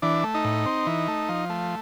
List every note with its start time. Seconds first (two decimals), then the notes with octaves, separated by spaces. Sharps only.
0.02 E3 D4
0.24 A3
0.34 D#4
0.45 A2
0.66 C4
0.87 E3
1.08 A3
1.29 F3
1.50 A3